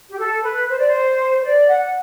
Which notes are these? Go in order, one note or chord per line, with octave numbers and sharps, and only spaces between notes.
G4
A4
B4
C5
D5
C5
C5
D5
F#5